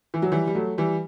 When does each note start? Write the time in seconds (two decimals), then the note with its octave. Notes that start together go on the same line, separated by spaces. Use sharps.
0.14 E3
0.22 F#3
0.32 E3 G3
0.47 G3
0.55 F#3 A3
0.78 E3 G3